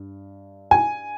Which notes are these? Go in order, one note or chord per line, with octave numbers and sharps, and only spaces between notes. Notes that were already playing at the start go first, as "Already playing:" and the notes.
Already playing: G2
G#5